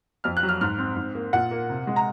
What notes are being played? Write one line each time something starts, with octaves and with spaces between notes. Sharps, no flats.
F2 F6
F#6
F#3
F6
G#2 F6
C4
G#2
A#3
A#2 F#5
A#3
C3
G#3
A#5